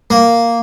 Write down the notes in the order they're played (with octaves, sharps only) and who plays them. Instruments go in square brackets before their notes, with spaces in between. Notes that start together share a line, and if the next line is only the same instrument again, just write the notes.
[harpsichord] A#3